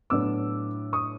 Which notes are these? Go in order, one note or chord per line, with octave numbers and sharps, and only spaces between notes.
A2 F#3 B3 D4 D6 E6
C#6 D#6